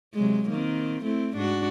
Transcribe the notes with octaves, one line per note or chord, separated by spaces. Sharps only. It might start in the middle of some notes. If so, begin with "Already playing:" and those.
C3 F#3 G#3
D#3 A#3 C4
A3 C4 E4
G#2 D4 F#4